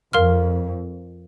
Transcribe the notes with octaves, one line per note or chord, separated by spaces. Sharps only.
F2 A#4 F5 C6 F6